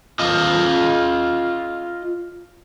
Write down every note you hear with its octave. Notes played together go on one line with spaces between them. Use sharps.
F4 D#5